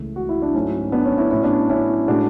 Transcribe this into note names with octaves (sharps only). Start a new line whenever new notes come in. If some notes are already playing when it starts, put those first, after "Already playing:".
Already playing: C#2 C#3 E3 A3
F#4
E4
D4
G#2 F#3 A3 C#4
B3 D4
C#4
C#4 E4
A2 F#3 A3 C#4 E4
B3 D4
C#4 E4
A2 G#3 D4 F#4